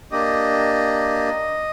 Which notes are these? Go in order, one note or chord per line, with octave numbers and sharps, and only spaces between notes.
A#3 D4 G4 D#5